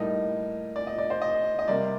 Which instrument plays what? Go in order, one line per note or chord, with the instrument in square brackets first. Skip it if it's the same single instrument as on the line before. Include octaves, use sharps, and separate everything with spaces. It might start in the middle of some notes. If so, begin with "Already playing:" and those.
Already playing: [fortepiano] A2 G3 A#3 D#4
D5
D#5
D5
C5
D#5
D#5
C3 G3 A#3 D5